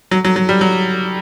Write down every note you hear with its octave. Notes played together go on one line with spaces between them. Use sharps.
F#3
F#3
F#3
G3
F#3